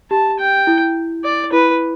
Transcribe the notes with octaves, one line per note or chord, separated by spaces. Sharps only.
G4 A5
G5
E4
D5
E4 B4